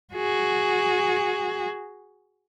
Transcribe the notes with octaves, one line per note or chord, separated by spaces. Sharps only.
F#4 G#4